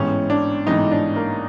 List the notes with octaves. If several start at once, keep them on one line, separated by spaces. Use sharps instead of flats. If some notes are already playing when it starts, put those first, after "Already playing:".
Already playing: A1 G#2 E3 G#3 B3 C#4
D4
A1 G#2 E3 G#3 B3 D#4
D4
A#3